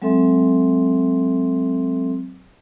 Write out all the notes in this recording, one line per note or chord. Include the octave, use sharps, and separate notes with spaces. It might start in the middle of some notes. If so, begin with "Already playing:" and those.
F#3 G#3 C4 A4 E5 C6